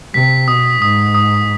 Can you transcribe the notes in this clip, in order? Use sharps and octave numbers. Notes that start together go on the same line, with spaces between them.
C3 B6
B2 D#6
G#2 D#6
D#6